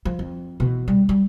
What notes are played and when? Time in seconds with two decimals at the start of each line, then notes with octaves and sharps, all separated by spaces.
0.05 F3
0.19 F2
0.60 B2 E3
0.88 G3
1.09 G3